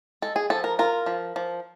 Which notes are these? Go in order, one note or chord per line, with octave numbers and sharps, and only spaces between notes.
G#3 A4
G#4
F3 A4
A#4
F4 A#4
F3
F3